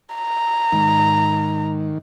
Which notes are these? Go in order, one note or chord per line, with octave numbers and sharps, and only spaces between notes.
A#5
G#2 D#3